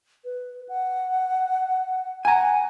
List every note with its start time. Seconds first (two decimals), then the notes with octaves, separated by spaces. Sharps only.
0.24 B4
0.69 F#5
2.25 F#5 G#5 A#5